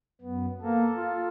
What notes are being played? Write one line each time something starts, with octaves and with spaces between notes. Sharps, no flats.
F#2 B3
A#3 A4
F4